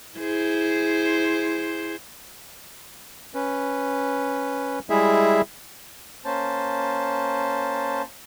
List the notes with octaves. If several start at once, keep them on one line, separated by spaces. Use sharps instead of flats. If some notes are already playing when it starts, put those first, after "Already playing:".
E4 G#4 C5
C#4 B4
G3 G#3 E4 G#4 E5
A#3 C#4 C5 A5